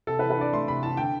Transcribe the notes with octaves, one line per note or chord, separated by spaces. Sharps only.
C3 A4
B4
E3
B4
D4 D5
A3 C6
C3 B5
E3 A5
D3 G5